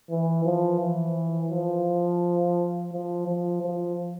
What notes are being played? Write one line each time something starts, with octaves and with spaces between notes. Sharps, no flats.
E3
F3
E3
F3
F3
F3
F3